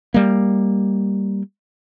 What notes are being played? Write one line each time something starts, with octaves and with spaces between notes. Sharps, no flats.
G3 A#3